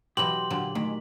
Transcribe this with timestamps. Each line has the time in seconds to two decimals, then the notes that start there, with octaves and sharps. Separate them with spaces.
0.17 B2 E3 F#3 G4 C6 F#7
0.50 A#2 D3 F#3
0.75 D#3 A3